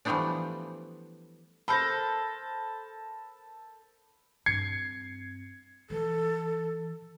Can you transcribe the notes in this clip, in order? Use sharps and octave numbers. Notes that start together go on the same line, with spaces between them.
E3 F3 G3 A3 B3 D4
A4 A#4 C5 B5 G6 A#6
G2 C4 G#6 C7 C#7
E3 A4